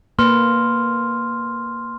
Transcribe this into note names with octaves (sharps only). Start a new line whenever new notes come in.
A#3 B4 C6 F6